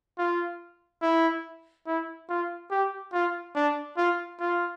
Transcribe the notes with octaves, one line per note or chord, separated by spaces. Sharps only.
F4
E4
E4
F4
G4
F4
D4
F4
F4